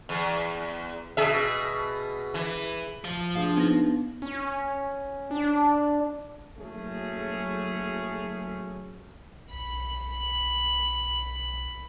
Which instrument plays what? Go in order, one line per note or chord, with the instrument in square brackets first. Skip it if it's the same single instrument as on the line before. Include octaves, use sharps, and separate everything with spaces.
[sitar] E2
B2 G#4 E5
E3
[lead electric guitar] F3 F4
[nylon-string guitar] D4 G#4 F5
[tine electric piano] B3 [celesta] D#4 A#6
[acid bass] C#4
D4
[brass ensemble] F#1 F#3 A3 C#4 G#4 A4
[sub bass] B1 [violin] B5